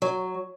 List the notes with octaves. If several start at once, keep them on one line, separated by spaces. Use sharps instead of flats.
F#3